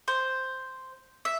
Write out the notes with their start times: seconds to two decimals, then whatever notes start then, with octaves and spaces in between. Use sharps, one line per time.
0.08 C5
1.25 E5